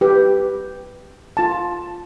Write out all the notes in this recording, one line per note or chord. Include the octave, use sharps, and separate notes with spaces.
G4 B4
F4 A5